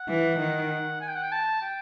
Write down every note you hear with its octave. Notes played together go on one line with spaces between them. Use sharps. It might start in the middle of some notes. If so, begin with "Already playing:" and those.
Already playing: F#5
E3
D#3
G#5
G5
F#5
G5
A5
G5